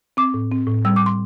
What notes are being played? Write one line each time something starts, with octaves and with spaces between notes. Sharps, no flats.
C4 D6
A2
C4
A2
G3 E6
D6
G3 C6